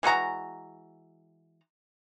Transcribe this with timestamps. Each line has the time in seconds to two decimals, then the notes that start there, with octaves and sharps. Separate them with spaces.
0.03 E3 G#3 F#4 A#5